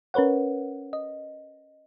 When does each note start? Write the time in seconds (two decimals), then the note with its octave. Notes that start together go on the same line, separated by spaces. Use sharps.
0.14 C#4 A#4 B4 C#5 F#5
0.93 D#5